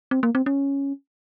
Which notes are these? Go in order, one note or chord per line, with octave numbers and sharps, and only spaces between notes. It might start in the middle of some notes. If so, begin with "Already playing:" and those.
C4
A#3
C4
C#4